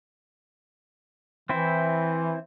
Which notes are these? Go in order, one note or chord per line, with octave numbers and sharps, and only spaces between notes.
E3 C4 E4 C5